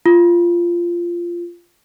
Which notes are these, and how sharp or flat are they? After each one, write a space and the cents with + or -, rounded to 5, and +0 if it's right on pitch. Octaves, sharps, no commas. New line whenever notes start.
F4 -15